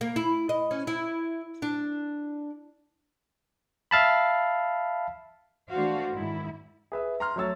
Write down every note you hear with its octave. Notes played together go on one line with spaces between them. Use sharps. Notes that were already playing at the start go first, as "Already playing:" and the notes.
A#3
E4
D#5
C#4
E4
D4
E5 F5 A5 B5
E3 A3 D4 F#4 C5 F5
G#2 D#3 E4
G#4 B4 E5
A#5 C6 F6
F#3 A3 C#5 E6 A6